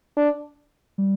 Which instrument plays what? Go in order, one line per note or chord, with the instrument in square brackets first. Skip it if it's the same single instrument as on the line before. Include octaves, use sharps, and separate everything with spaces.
[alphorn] D4
[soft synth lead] G3